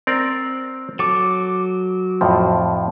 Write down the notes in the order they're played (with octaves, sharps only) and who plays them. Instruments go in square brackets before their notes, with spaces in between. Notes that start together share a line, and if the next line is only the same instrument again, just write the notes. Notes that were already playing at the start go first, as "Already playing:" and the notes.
[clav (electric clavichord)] C4 A#4 D5
[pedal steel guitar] F#3 D6 [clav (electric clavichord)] A4
[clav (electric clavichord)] F2 A2 F3